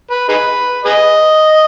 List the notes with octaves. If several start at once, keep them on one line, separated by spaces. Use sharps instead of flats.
B4
D#4 G#4 B4
G#4 B4 D#5